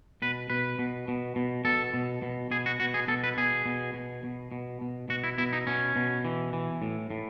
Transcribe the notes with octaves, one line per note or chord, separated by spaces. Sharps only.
B2 B4
B2 B4
B2
B2
B2
B2 A4
B2
B2
B2 G#4
F#4
B2 F#4
G#4
B2 A4
B4
B2 G#4
B2
B2
B2
B2
B2
B2 F#4
E4
B2 E4
D#4
B2 C#4
B2
E3
E3
A2
A2